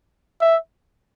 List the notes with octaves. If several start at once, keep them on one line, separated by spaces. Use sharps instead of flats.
E5